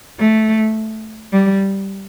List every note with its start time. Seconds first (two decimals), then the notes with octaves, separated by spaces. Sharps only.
0.19 A3
1.34 G3